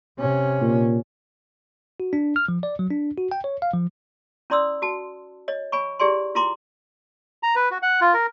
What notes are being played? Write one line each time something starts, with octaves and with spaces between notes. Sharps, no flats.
C3 C#4
A#2
F#4
D4
F6
F3
D5
F#3
D4
F#4
G5
C#5
F5
F3
C#4 E4 D5 C6 D#6 E6
F#4 A5
C#5 D#5
C#5 G#5 B5 C#6
E4 G4 G#4 D5 G#5 C6
E4 F4 A#5 C6 D6
A#5
B4
F#4
F#5
F4
A#4